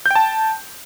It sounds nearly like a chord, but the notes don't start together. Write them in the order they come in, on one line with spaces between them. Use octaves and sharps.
G6 G5 A5